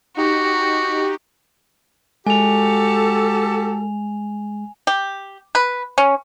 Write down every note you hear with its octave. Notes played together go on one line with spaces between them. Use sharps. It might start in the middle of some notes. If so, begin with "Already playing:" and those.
D#4 F#4 G4
G#3 F#4 G4 A4 G#5 F7
G4
B4
C#4